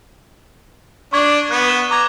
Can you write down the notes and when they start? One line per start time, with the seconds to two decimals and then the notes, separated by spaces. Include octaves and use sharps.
1.13 D4 C#6 G#6
1.51 B3 F#6
1.68 F#6 E7 G7
1.91 A#5 D6 G#6